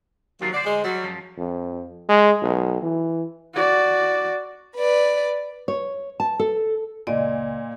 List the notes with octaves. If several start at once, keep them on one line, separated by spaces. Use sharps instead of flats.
D#2 F3 F#3 A#3 F4
D2 F#4 C5 D5
G#3
F#3 G3
F#2 F3
F2
G#3
B1
E3
F#4 D5
B4 D5
C#5
A5
A4
F#1 C#2 A#2 D5 D#5